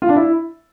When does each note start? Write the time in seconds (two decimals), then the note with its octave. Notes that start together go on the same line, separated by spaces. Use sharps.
0.02 F4
0.09 D4
0.16 E4